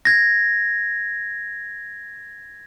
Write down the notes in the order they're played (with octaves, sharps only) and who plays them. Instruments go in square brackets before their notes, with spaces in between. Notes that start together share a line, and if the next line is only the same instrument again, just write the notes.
[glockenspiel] G#6 A#6